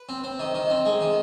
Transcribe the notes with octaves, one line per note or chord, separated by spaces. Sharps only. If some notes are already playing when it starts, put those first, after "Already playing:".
Already playing: B4
C4
C4
D#3
D#3
C4
G#3
D#3